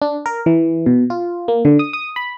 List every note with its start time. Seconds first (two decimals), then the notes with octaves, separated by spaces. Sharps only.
0.02 D4
0.26 A#4
0.46 E3
0.86 B2
1.10 F4
1.48 A#3
1.65 D3
1.79 D#6
1.93 D#6
2.16 B5